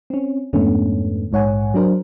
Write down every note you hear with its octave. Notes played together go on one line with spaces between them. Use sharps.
C4 C#4
F2 G#2 D3 A3 B3 C#4
A#1 G#2 C#5 F#5 G#5
F#3 D4 A#4 C5